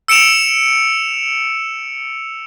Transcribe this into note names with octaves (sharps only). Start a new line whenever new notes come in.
E6 C#7 D7 E7 F7